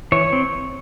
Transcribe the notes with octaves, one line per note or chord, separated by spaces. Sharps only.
E3 C#5
C4